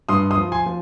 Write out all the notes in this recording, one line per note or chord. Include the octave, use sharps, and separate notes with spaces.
G2 C6 D#6
C6 D#6
F3
G#5 C6
F3